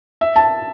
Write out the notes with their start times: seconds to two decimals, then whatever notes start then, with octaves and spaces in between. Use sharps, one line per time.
0.21 E5
0.36 A5